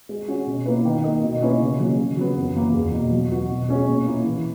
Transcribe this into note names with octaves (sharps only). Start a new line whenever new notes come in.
G#3
C#4 F#4
B2
A#3 E4 B4
D#3
A#3 D#4 A#4 D#5
B2
A#3 C#4 E4 B4
C#3
F#3 A#3 C#4
C#3
F#3 B3
F#2
E3 A#3 E4
E2
B2 A#3
F#3
B3 F#4
B2
G#3 C#4 G#4
A#2
A#3 E4
E3